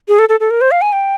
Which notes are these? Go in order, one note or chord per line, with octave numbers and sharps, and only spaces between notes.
G#4
A4
A4
A4
A#4
C5
F5
G#5
G5